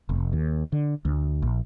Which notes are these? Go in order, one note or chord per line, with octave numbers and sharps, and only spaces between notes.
F1
D#2
D3
D2
A#1